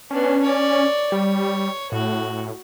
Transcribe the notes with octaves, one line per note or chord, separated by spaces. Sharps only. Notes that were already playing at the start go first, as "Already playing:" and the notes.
B3 C#4 D4
C#5 D5
G3 C#5
A2 F#4